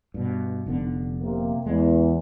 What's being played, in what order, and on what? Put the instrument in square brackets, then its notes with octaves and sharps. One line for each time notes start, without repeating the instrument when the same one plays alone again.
[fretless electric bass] G2 B2
F1 D3 B3
[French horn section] C3 A#3
[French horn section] E2 [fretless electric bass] G#3